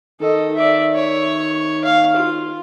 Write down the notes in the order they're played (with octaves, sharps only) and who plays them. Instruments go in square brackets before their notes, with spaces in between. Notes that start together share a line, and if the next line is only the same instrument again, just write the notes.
[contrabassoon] D#3 [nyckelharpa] A4 D#5
[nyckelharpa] D5 E5
C#5
F5
F4